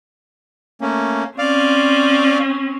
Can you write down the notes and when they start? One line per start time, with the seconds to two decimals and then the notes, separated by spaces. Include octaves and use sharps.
0.81 A3 A#3 C#4
1.38 C4 C#4 D5 F5